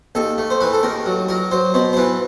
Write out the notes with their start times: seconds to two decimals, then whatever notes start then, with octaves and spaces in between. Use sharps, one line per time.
0.15 D#2 A4
0.38 A3
0.50 C5
0.61 E3 B4
0.73 A4
0.83 D#2 A#4
1.06 F#3
1.29 F#3 A#4
1.51 F#3 C5
1.74 B2 C5
1.93 C5
1.97 E3 B4